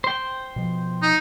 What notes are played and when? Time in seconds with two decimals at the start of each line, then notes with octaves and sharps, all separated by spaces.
0.04 C5 G5
0.56 B2 F3
1.02 D#4